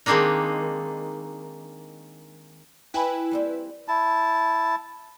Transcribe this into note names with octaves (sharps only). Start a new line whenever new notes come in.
D#3 G#3 A#3 C4 D4 D#4
E4 B4 G5 G#5 B5
G3 A#3 C4
E4 A5